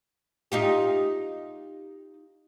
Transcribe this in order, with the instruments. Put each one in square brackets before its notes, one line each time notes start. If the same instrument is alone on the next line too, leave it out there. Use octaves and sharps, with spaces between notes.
[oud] D#4 F4 G4